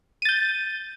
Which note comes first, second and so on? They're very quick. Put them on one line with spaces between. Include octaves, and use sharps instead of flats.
D#7 A6 G6